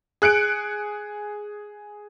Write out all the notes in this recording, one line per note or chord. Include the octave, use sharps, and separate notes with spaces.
G#4 F#6 C#7 D7